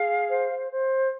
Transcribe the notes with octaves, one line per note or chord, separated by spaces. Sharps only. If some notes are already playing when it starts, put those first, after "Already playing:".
Already playing: G#4 F5
C5
C5